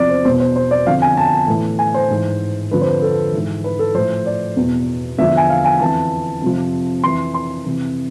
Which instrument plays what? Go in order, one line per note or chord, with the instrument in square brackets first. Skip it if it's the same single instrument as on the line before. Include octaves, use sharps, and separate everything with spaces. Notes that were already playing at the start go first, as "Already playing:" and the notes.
Already playing: [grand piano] E2 C3 F3 D5
C5
E2 B2 C5
C5
C5
D5
F2 D3 F3 F5
G#5
A5
A2 E3
G#5
C5
G#2 E3
F2 D3 F3 B4
C5
B4
A4
G#2 E3
B4
A4
A2 F3 C5
D5
E2 B2
E2 D3 F3 E5
G#5
F5
G#5
F2 E3 A5
F2 C3 F3
F2 E3 C6
C6
F2 C3 E3